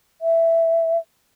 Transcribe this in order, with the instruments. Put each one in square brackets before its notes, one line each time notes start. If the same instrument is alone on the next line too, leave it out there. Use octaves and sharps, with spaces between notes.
[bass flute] E5